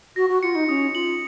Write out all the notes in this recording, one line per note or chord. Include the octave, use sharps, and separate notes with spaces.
F#4 A#6
F#4
F4 C#7
D#4
C#4 D#6
F4 F#7